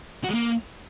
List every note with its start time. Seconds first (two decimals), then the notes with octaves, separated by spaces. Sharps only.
0.24 F#4
0.29 G#3
0.34 A#3